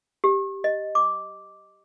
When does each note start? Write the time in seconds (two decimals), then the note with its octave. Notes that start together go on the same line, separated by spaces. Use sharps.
0.24 G4
0.64 D#5
0.95 D6